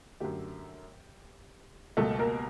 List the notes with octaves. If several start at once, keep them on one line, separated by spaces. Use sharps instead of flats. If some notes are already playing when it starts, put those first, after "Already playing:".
F#2 D3 F#3 A3 G4
C#2 B2 G3 A3 A#3 A4
A#3 A#4